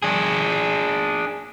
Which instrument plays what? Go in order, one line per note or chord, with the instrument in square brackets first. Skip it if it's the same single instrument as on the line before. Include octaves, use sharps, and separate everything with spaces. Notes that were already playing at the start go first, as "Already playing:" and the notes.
[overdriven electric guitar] D4 G#4